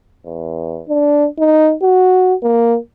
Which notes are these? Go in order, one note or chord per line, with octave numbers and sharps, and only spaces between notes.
E2
D4
D#4
F#4
A#3